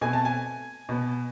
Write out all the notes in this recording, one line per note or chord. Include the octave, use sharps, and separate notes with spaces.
B2 A3 C4 G#5
A5
G#5
B2 B3